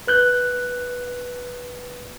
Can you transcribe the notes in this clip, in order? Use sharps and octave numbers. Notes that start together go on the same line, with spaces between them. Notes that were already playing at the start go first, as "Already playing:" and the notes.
B4 F#6 G6